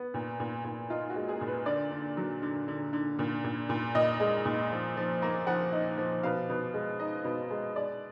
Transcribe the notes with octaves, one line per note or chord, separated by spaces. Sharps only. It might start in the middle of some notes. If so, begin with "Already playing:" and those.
Already playing: B3
A#2
A#2
A#2
D#4 F4
F#4
G#3
G#4
A#2
B4
D3 D5
D3
F#3
D3
D3
D3
A#2
A#2
A#2
A#2 D#5
G#3
A#2
F3
F3
A#3
F3 F#5
D#4
F3
B2 F5
B2
G#3
D#4 D#5
B2
G#3
G#3 D5